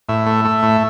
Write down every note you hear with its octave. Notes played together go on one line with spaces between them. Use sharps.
A2 E5
A3
A3
A2